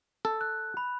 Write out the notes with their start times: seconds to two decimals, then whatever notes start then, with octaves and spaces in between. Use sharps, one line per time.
0.25 A4
0.41 F#6
0.77 B5